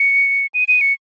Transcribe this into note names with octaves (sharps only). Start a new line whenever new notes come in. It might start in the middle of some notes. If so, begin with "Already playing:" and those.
Already playing: C#7
D#7
D#7
C#7